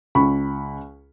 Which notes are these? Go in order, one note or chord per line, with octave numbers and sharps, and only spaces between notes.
C#2 B5 C#6